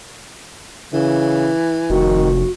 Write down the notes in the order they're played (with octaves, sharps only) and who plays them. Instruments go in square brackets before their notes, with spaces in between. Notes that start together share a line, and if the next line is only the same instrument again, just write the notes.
[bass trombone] C#3 [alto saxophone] E3
[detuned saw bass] F1 [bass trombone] D#3 [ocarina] F#4